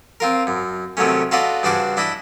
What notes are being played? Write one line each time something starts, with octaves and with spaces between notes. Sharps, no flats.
C4 F4 A#4
F#2
C3 D#3 F#3 A3 C#4
F4 F#4 A4 B4 D5 D#5
G2 C#3 D4 F#4 C5 D6
D4 E4 D#5 B5